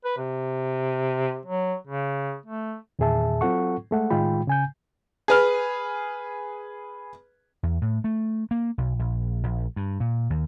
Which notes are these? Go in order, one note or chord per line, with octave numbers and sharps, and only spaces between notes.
B4
C3
F#3
C#3
A3
E2 A#2 D#3 G#4 E5 A5
F#3 C4 F4 A4 F#5 C#6
G#3 A3 F#5
A2 D#3 G#3 F4 G5 B5
C#3 G#5 G6
G#4 B4 F6
E2
A2
A3
A#3
B1
A#1
A#1
G2
A#2
D#2